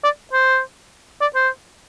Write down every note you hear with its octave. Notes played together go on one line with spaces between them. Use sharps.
D5
C5
D5
C5